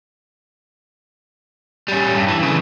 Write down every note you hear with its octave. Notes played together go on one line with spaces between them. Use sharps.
G3 C#4
G2
E3
C#3 E3